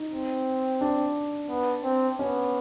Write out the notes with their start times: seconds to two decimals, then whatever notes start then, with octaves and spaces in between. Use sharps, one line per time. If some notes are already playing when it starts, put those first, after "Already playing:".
Already playing: D#4
0.11 C4
0.81 D4
1.49 B3
1.84 C4
2.19 B3 C#4